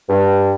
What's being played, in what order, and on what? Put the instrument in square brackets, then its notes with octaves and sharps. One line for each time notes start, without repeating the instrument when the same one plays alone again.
[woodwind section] G2